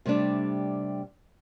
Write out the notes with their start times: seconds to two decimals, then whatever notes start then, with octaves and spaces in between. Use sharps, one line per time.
0.06 C3 G3 A3 D4